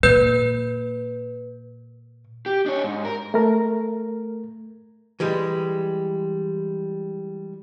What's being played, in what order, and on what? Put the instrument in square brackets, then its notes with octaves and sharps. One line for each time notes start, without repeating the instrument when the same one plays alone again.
[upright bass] A#2 [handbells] B4 G6
[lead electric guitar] G4
D4 C#5
G#2
A#4
[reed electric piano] A3 A#4
[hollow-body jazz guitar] E3 G3 G#3